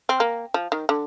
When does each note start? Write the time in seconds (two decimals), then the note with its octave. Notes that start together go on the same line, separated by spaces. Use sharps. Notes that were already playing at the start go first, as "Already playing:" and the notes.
0.09 C4
0.20 A#3
0.54 F3
0.72 D#3
0.89 D3